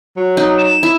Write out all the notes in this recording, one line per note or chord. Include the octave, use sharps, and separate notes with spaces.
F#3
D#4
E7
E4